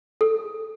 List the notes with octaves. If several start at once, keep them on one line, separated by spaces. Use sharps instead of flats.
A4